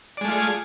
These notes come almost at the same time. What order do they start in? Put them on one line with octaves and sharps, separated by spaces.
D5 G#3 A3 F4 G#4